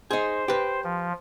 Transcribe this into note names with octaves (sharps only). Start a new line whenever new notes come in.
D#4 G#4 C5
G4 B4
F3